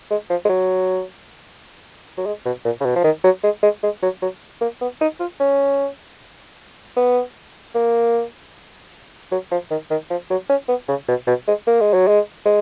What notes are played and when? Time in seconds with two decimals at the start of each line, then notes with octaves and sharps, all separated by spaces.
0.11 G#3
0.30 F3
0.45 G#3
0.49 F#3
2.18 F#3
2.26 G#3
2.46 B2
2.65 A#2
2.81 C#3
2.85 B2
2.96 F3
3.04 D#3
3.24 F#3
3.44 G#3
3.63 G#3
3.84 G#3
4.03 F#3
4.22 F#3
4.61 A#3
4.81 B3
5.01 D#4
5.20 F4
5.40 C#4
6.97 B3
7.75 A#3
9.32 F#3
9.51 F3
9.71 D#3
9.91 D#3
10.10 F3
10.30 F#3
10.50 C#4
10.69 B3
10.89 C#3
11.08 B2
11.27 B2
11.48 G#3
11.67 A#3
11.81 G#3
11.94 F#3
12.08 G#3
12.45 G#3